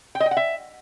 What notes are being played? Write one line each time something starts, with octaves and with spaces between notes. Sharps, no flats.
G5
D#5
G5
F#5
E5